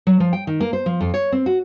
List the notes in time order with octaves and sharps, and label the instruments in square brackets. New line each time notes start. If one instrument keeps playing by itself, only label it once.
[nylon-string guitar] F#3
F3
G5
D#3
A#3
C5
F3
F2
C#5
C4
F#4